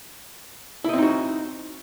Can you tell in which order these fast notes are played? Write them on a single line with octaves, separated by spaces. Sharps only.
E4 D#5 C4 D#4 F#4